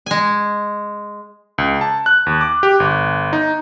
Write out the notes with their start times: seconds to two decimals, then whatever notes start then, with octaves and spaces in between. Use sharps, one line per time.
0.06 G#3 G#5
1.58 C#2
1.81 A5
2.06 F#6
2.26 D#2
2.41 D6
2.63 G4
2.80 G1
3.33 D#4